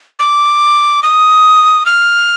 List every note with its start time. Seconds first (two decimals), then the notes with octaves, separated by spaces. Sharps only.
0.19 D6
1.03 D#6
1.86 F6